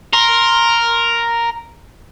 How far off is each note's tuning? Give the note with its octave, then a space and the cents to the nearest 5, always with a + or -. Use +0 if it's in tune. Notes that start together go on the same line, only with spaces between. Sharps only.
A#4 +0 C6 +10